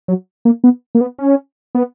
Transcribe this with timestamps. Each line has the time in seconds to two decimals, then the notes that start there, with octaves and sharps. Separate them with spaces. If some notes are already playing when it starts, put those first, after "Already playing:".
0.08 F#3
0.45 A#3
0.64 B3
0.95 A#3
1.01 B3
1.19 C#4
1.75 B3